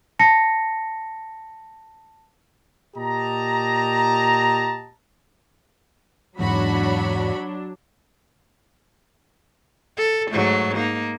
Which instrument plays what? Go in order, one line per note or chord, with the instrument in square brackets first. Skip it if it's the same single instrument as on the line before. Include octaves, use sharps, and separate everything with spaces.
[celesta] A5 A#6 C#7
[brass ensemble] A#2 G4 D#5 A5 A#5
[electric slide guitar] E2 G#2 [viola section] F#3 D4 [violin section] F#4 C#5 B5
[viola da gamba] A4
G#2 F#3 A3
A#3 D#4